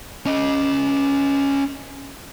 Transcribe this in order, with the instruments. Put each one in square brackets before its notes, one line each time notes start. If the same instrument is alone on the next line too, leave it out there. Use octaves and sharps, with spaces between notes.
[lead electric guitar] C#4 D#5